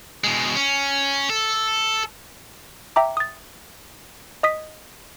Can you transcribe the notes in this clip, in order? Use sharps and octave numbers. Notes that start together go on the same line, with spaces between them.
B2 G#3
C#4
A4
E5 G5 A#5 D6
D#6 A6
D#5 D#6 B6